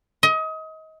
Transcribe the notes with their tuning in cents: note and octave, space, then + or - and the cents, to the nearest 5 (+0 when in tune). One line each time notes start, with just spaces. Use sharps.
D#5 +30